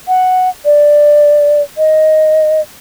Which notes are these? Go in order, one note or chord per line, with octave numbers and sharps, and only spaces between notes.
F#5
D5
D#5